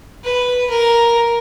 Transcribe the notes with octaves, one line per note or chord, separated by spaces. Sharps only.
B4
A#4